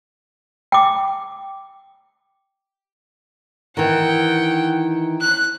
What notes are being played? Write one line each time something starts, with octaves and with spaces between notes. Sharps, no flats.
G5 D6
D#3 E3 F#5 G5
F#6